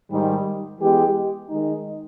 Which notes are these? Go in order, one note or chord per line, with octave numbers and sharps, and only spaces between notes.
G#2 D#3 G3
E3 G#3 B3 G4
D#3 G#3 D#4